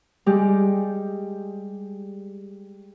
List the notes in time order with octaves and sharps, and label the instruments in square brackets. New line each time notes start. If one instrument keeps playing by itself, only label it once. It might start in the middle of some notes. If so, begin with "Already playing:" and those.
[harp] G3 G#3 G4